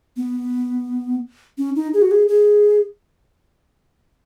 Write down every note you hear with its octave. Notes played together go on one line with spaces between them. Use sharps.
B3
C#4
D#4
G#4
F#4
G#4
G#4